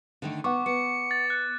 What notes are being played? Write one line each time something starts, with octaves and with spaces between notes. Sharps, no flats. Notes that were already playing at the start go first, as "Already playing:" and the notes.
D3 D#3 A3
B3 F#5 C#6 D6
B3 C#7
A6
F#6